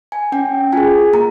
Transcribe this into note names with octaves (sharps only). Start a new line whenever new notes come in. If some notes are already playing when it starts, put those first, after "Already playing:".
G#5
C#4 G5
F4 G#4 G#5
A#3 A#5